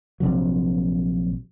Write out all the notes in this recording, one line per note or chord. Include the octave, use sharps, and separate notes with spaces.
A#1 C3 F#3